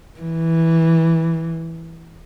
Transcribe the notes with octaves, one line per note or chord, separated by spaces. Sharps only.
E3